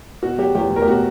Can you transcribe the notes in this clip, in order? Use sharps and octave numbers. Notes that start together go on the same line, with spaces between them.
B2 F#4
F#3 G4
E2 G4
E2
A#4
G4
B2 F#4